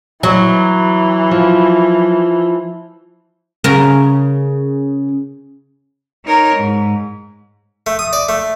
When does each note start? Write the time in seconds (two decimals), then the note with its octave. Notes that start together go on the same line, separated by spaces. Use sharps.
0.23 E3 F#3
1.31 F3
3.64 C#3 A#4
6.25 D#4 A#4 C#5
6.56 G#2
7.87 A3
7.99 D#6
8.13 D5
8.29 A3